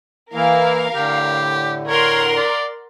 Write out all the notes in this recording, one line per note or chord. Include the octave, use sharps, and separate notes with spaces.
E3 A#3 E4 A#4 F5
A2 D3 G4
A#4 C#5 F#5 C6
D5